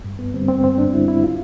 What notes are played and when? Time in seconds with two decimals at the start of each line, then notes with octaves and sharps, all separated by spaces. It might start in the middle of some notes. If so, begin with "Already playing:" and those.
0.04 G2
0.19 B3
0.34 D3 G3 C4
0.48 C4
0.64 G2 C4
0.78 D4
0.93 D3 G3 E4
1.08 E4
1.24 F4